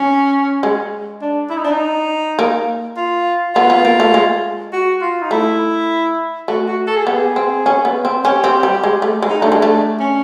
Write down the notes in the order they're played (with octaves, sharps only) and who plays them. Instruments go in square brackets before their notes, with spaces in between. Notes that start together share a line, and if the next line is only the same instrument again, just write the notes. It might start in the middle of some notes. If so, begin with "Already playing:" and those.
Already playing: [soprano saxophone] C#4
[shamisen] G#3
[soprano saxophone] D4
E4
D#4
D4
D#4
[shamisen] A#3
[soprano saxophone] F4
[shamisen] B3 [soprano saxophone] F4
[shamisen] B3
A#3
A3
G#3
[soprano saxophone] F#4
F4
D#4
[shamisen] A3 [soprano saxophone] E4
[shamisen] A3 [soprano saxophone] F#4
[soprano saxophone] F#4
A4
G#4
[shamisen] B3 [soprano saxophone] G4
[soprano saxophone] G#4
[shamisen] C4
C#4
B3
C4
[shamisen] C#4 [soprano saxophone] G4
[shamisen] C4
G3
G#3
A3
G#3
[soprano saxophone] D#4
[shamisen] A3 [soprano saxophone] D4
[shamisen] G#3
A3
[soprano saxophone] C#4